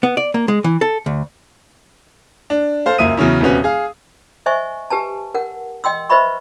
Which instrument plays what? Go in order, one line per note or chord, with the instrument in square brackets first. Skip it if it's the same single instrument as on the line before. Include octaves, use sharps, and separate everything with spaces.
[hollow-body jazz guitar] B3
D5
A#3
G#3
E3
A4
D2
[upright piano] D4
A4 C5 F5
C#2 F#2 A#3 E5 D#6 D#7
E2 C#3 F#3 C#4 E4
D#1 C3 B3 C#4 F#4
G#4 F5
[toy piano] C5 D#5 E5 G#5 C#6
G4 B4 G#5 A5
A#4 F#5
D#5 G5 C6 E6
B4 C5 D#5 E5 B5 C#6